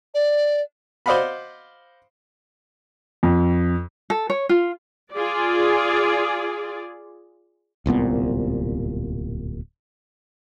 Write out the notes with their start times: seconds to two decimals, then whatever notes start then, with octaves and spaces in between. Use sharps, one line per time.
0.14 D5
1.06 C5 D5 D#5 F5 F#5 B5
3.23 F2
4.10 A4
4.30 C#5
4.49 F4
5.14 F4 G#4 D5
7.86 D1 C2 A#2 B3